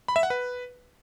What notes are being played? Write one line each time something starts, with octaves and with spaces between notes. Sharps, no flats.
B5
E5
F#5
B4